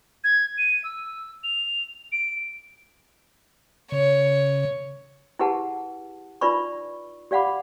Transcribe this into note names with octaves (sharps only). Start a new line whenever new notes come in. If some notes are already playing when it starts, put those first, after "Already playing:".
G#6
D#7
E6
F7
D7
C#3 C#5
E4 G4 G#4 B4 F#5 A5
D#4 F4 B4 D5 B5 C#6
G4 D5 F5 F#5 B5 D6